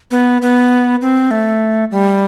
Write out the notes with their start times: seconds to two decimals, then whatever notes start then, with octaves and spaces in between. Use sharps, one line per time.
0.11 B3
0.42 B3
1.02 C4
1.31 A3
1.91 G3